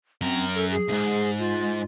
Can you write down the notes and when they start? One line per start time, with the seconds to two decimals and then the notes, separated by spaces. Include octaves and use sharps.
0.22 F#2 C4 A#4
0.55 A4
0.71 G#4
0.88 C2 G#2
1.39 F4